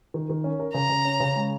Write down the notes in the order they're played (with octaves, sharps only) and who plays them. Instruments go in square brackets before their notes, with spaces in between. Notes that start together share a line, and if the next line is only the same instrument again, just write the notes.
[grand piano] D#3
D#3
C#4
A#4
[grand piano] C#3 [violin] A#5
[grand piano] C#3
C#4
C#3
G#3